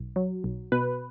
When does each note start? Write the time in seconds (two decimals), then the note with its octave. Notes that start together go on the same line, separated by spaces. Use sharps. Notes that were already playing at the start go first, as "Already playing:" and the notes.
Already playing: B1
0.16 F#3
0.44 B1
0.72 B2 B4